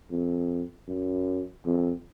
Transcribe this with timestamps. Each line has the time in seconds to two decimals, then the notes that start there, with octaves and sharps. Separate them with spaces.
0.10 F2
0.88 F#2
1.65 F2